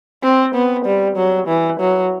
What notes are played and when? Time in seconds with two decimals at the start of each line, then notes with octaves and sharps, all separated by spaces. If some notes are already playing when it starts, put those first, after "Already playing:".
0.23 C4
0.55 B3
0.86 G3
1.17 F#3
1.48 E3
1.80 F#3